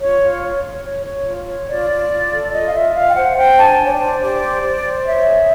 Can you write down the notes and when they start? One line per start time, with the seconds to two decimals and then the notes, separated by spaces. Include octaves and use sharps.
0.01 F4 C#5
0.22 F4
0.43 C#5
0.63 C#5
0.84 C#5
1.06 C#5
1.26 F4
1.48 C#5
1.69 F4 D5
1.90 F4
2.11 F4
2.32 A4
2.52 F4 D#5
2.66 F5
2.73 F4 E5
2.95 F4 F5
3.09 G5
3.15 C5 F#5
3.32 F#5
3.36 C5 G5
3.58 D4 A5
3.65 G#5
3.79 D4
3.85 C#5
3.93 D5
4.00 C5
4.20 G4 D5
4.41 C5
4.63 C5
4.83 C5
5.05 C#5 E5
5.26 G#4